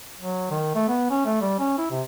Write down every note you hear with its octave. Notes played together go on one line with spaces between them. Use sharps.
F#3
D#3
A3
B3
C#4
A3
G3
C#4
E4
C3